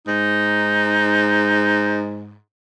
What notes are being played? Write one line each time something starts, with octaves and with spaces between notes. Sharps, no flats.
G#2 D#4